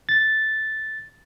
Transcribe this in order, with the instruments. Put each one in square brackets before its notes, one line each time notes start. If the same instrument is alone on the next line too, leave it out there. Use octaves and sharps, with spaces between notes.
[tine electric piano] A6